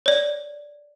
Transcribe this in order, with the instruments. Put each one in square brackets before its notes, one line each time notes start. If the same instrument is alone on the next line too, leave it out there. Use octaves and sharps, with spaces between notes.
[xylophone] C#5 D5